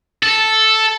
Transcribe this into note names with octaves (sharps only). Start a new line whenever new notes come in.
A4